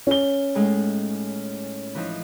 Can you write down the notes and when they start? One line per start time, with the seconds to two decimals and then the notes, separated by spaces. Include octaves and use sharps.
0.07 C#4 G7
0.55 A2 G#3 D#4
1.95 E3 F3 D#4